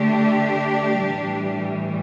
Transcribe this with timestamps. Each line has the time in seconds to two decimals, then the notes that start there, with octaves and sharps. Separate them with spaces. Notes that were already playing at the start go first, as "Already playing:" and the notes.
Already playing: D3 A3 D4 G4
0.99 A2 E3 G3